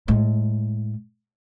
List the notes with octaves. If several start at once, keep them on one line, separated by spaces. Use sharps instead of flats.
A2 G#3